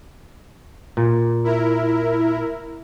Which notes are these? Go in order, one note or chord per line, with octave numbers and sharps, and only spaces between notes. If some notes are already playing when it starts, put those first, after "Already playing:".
A#2
E4 A#4